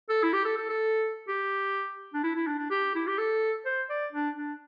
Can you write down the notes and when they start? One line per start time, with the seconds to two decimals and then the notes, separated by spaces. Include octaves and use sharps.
0.10 A4
0.23 E4
0.33 G4
0.45 A4
0.57 A4
0.69 A4
1.28 G4
2.14 D4
2.24 E4
2.36 E4
2.47 D4
2.59 D4
2.71 G4
2.95 E4
3.07 G4
3.18 A4
3.65 C5
3.90 D5
4.13 D4
4.36 D4